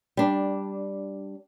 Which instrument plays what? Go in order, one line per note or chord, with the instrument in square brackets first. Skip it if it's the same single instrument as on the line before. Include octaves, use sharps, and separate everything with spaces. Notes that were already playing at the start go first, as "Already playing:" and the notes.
[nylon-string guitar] G3 D4